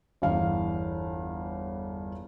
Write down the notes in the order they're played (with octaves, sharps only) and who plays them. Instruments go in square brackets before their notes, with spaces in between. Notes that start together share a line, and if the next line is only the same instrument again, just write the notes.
[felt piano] G1 E2 F5